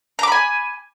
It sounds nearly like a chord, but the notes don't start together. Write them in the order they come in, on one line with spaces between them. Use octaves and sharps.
A#5 D6 B5 G#5